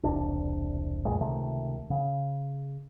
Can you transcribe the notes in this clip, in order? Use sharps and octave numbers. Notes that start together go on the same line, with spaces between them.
E1 C2 D4
F2 A#2 G#3
C#2 C3 D#3 A3
C#3